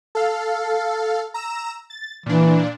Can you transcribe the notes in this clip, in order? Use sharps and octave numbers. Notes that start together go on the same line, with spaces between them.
A4 F5
A#5 E6 E7
A6
A#2 E3 D4